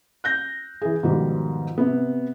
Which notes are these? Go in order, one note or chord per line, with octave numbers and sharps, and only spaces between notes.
F#6 G6 A#6
E3 G#4
G#2 B2 D#3 F3 G3
C3 B3